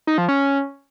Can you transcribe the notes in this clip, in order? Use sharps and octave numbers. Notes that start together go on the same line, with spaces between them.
D#4
F3
C#4